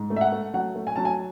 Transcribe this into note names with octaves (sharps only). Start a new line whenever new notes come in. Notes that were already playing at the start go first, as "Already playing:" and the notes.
Already playing: G#2
A3
E5
F#5
A3
F#3 F#5
A3
G#5
F#3 A5
G#5